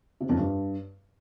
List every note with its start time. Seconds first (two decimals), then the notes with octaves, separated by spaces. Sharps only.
0.21 C3
0.29 F2
0.38 G2